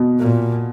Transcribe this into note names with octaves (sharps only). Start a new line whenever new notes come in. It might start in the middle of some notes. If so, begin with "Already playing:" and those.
Already playing: B2
A#2